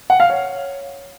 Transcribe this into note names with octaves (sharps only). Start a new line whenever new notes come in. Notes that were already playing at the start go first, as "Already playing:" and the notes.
F#5
F5
C#5